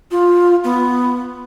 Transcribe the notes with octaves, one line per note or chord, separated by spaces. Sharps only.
F4
B3